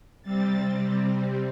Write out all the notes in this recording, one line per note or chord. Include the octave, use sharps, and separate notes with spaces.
C3 G3 C4 A6